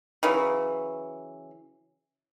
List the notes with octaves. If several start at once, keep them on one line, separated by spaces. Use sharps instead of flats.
C#3 E3 F#3